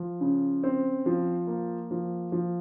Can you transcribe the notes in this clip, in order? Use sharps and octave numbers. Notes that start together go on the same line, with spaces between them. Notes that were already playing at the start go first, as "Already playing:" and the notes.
Already playing: F3
C#3
C4
F3
A#3
F3
F3